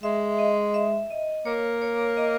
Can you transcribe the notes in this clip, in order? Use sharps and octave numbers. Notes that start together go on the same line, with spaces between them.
G#3 E5
D#5
E5
D#5
A#3 C#5
C#5
D#5